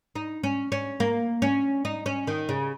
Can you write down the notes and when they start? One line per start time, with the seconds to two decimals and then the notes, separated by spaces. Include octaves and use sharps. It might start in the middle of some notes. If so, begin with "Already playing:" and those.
0.15 D#4
0.43 C#4
0.72 C#4
1.00 A#3
1.42 C#4
1.85 D#4
2.06 C#4
2.27 D#3
2.49 C#3